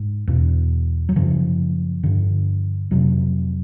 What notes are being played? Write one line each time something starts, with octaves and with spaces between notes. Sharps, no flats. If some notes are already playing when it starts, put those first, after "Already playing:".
Already playing: G#2
E2 B2
F#3
F#2 C#3 F3
G2 D3
F2 C3 F#3